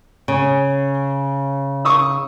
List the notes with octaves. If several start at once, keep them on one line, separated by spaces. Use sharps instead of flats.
C#3
C#6 D#6 E6